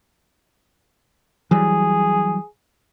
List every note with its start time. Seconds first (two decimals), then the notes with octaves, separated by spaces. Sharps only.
1.51 E3 F#3 G3 G#4